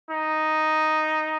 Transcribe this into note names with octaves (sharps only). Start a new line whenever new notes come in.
D#4